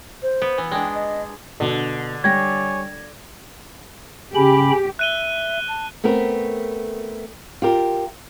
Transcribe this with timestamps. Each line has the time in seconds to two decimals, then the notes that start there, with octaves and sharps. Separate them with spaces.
0.23 C5
0.42 B3
0.58 E3
0.72 G#3 D4 G5
0.94 D#5
1.60 B2 D3
2.24 G3 C#5 D5 G5 G#5 G#6 A#6
4.35 C#3 C#4 G4 B5
4.99 E5 F#6 D#7 G7
5.68 A5
6.04 A3 B3 C4 A#4
7.62 F4 G4 A#4